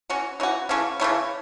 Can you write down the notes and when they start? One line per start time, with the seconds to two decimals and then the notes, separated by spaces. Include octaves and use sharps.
0.10 E3 C#4 F#4
0.40 E3 C#4 F#4
0.69 C#3 E3 A3 C#4
1.00 C#3 E3 A3 C#4